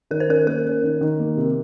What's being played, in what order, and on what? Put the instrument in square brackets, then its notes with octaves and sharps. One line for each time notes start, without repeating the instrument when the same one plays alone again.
[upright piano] D#3 [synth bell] A#4
[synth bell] C5
[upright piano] C#4 [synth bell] A#4
[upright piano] A#3 [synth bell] A#4
[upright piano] C#4
D#3
D#3
A#3
C3